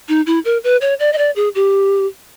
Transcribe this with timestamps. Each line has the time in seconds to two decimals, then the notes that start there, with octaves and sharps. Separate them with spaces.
0.09 D#4
0.27 E4
0.45 A#4
0.64 B4
0.81 C#5
1.00 D5
1.13 D#5
1.18 D5
1.36 G#4
1.55 G4